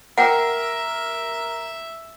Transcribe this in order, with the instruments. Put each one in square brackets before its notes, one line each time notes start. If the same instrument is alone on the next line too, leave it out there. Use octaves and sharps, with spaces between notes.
[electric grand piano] A#4 [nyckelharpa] E5 [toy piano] F#5 G5